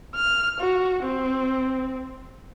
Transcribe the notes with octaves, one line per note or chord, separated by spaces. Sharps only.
F6
F#4
C4